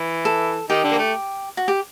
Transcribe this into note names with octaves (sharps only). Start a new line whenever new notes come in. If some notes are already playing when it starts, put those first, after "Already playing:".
Already playing: E3 E4
A4
D#3 D#4 G4
D3 D4
A#3
A3
F#4
G4